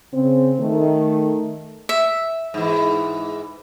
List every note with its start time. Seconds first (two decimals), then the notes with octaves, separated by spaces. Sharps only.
0.14 C#3 C4
0.60 D#3 A3
1.89 E5
2.54 G#2 E3